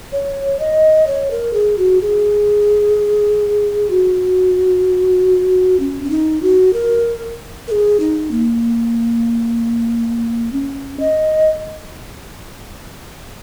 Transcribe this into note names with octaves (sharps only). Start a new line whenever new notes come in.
C#5
D#5
C#5
A#4
G#4
F#4
G#4
F#4
C#4
C#4
D#4
F#4
A#4
A#4
G#4
D#4
A#3
C#4
D#5